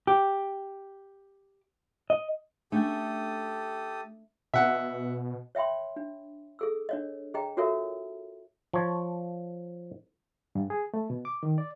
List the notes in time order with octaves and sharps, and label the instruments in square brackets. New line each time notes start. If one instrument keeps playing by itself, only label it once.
[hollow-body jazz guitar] G4
D#5
[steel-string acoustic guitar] A3 [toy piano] C#4 D4 [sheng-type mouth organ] G4 A4 D#6
[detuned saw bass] B2 [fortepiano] E5 F#5
[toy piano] C#5 E5 G5 B5 C6
D4
G#4 A4 E6
D4 C#5 D#5
G#4 C#5 D#5 G5 A#5
F4 F#4 A4 A#4 C#5 E5
[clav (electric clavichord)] F3 C#5 A5
[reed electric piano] G2
G#4
A3
B2
D6
D#3
D5